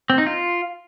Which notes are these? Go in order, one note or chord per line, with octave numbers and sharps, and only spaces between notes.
C4
D#4
F4